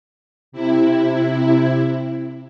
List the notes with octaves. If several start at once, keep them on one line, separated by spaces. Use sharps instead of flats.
C3 E4